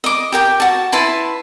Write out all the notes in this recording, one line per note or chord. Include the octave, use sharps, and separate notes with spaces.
D#5 D6
G4 A#4 G5
F#4 A5
E4 B4 A5 C6